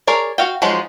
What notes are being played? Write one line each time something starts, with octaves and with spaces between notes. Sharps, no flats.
G#4 A#4 C#5 D5
F#4 F5 G5
F3 F#3 G#3 D#4 F4